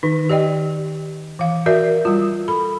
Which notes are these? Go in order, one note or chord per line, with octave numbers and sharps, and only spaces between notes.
D#3 D#4
G4 D5 D#5 G5
E3 F5
F#4 A#4 D5 E5
G3 F4
A4 B5